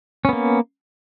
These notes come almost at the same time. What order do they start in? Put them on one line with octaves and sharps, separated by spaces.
C#4 B3 A#3